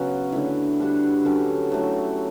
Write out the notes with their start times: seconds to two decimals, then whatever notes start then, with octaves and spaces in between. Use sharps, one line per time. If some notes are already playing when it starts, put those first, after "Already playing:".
Already playing: C#3 F#3 B3 C#4 F#4
0.32 D3 A3 E4
0.79 G3 D4 F#4
1.25 D3 F#3 C#4 G4
1.72 F#3 A3 E4 G4